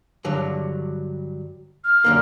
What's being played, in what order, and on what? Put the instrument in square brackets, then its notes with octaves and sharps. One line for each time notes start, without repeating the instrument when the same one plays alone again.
[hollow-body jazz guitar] G2 D3 F#3
[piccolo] F6
[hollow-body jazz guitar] F#2 D3 A#3